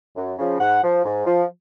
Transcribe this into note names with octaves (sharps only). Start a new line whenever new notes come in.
F#2
C#3 F3
G#2 F#5
F3
G#2
F3